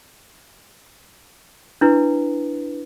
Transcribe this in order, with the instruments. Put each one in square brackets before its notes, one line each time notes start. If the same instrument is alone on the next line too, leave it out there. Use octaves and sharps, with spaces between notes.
[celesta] D4 E4 B4